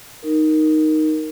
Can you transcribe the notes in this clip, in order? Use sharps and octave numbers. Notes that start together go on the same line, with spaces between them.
D#4 A#4